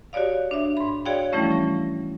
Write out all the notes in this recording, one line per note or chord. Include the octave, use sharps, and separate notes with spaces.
F#4 G4 C#5 D5 F5
D4 E5
G#2 B5
F#4 G#4 C#5 D5 F5 G5
E3 F3 G3 A3 C#4 E4
C#4 A#6